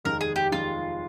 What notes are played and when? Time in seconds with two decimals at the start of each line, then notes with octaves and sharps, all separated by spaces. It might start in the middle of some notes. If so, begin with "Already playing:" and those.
0.05 F1 D#2 D#3 G#3 D#4 A#4
0.21 G#4
0.36 G4
0.52 F1 D#2 D#3 G#3 D#4 F4